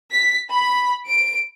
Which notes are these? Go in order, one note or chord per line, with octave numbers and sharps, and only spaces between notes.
B6
B5
D7